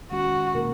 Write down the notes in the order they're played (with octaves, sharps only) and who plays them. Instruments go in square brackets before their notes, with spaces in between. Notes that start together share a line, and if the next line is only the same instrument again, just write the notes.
[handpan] D#3 G#3 C#4 [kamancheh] F#4
[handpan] B2 A#3 D#4 A#4